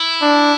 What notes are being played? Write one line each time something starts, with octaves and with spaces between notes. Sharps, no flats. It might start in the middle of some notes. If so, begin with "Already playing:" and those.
Already playing: E4
D4